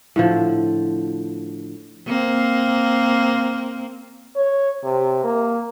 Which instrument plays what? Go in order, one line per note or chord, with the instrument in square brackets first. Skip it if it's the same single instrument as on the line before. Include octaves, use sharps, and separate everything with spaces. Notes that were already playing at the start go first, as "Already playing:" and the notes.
[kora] A2 D3 F3
[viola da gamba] A#3 C4
[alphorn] C#5
C3
A#3